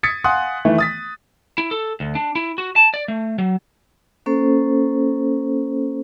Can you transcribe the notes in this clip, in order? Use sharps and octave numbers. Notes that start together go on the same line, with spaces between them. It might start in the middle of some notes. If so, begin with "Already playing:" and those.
D#6 G#6 A6 B6 C#7
F5 F#5 G#5 C6 D#6 F#6
D#3 E3 A3
D#6 A6 B6
E4
A4
D2
D4
E4
F#4
A5
D5
A3
F#3
A#3 C#4 A4 C5